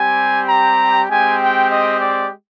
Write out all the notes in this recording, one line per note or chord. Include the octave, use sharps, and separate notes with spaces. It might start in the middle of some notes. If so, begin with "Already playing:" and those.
Already playing: G3 C4 G4 G#5
A#5
G#3 C4 G4 G#5
G5
D#5
D5